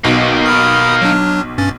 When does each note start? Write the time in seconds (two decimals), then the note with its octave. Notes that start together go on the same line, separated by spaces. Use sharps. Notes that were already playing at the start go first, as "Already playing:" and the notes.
0.05 B1 D#3 A#3
0.46 B5 D#6 F6
1.02 F#3 D4
1.58 G2 C#4 A6